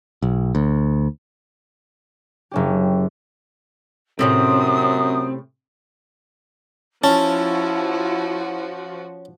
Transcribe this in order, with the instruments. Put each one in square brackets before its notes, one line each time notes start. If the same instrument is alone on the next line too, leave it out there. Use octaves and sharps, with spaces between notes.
[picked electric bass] B1
D2
[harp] F#1 C#4 G4
[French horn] F#2 [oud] A2 C3 C#4 [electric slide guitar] C4 [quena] D#6
[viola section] F3 F#4 [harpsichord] C#4 [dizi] E4 [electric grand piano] A5